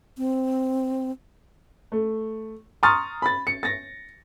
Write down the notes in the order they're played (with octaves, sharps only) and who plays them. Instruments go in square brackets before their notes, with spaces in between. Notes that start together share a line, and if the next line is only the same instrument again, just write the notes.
[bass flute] C4
[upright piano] A3
A#5 C6 C#6 D#6 F6 A6
B5 A6
C#7
A6 A#6